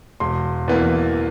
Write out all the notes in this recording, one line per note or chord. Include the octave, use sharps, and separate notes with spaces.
E1 C6
E2 E3 A#3